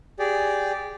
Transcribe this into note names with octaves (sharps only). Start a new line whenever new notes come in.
G4 G#4 D5